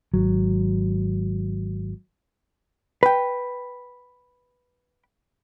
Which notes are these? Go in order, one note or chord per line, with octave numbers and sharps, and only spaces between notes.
G#1 F#3
B4 G5